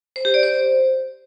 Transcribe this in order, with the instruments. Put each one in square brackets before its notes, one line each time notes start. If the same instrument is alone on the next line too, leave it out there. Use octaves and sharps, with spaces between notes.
[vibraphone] C5
G4
D5
C5